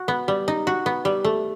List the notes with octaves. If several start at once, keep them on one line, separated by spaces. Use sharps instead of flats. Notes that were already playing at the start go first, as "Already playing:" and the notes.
Already playing: F#4
B3
G3
D#4
F#4
B3
G3
A3